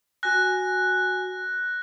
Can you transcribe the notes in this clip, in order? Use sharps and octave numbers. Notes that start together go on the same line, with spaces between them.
F#4 G#5 F#6 A#6